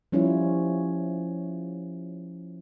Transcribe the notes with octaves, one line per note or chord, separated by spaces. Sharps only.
F3 G3 C#4 E4 F4 C#5